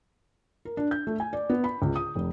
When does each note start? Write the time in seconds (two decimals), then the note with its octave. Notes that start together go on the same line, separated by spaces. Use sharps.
0.65 A#4
0.77 D4
0.91 G6
1.07 A3
1.20 G#5
1.33 D5
1.50 B3
1.64 B5
1.82 C#2
1.96 D#6
2.15 F1